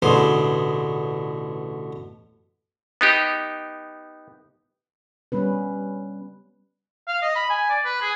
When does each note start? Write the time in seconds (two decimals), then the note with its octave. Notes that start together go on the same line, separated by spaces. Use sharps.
0.02 A1 B2 D3 G#4 C6
3.01 B3 D#4 G4
5.32 G3 B3 C#4 B4
7.07 F5
7.22 D#5
7.35 B5
7.50 G#5
7.70 D5
7.85 B4
8.01 G#4